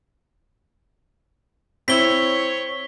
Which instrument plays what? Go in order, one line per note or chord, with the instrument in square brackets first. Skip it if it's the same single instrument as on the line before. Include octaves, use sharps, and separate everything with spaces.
[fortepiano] C4 E4 [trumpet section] C#5 [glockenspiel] B6 G7